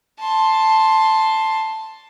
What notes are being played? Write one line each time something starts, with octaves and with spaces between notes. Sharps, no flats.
A5 C6